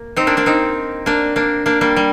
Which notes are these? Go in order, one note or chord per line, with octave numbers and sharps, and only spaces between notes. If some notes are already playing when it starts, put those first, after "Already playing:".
Already playing: A#3
C4 D#4
A#3 D4
A#3 D4
C4 D#4
A#3 D4
A#3 D4
A#3 D4
G3 A#3
G3